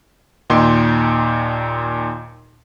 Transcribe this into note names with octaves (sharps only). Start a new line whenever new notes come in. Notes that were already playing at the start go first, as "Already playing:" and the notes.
D#2 A#2 D#4 G5 C6